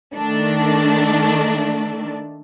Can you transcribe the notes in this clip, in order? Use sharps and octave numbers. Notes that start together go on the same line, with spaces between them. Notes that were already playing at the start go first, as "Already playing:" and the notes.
D#3 A3 D4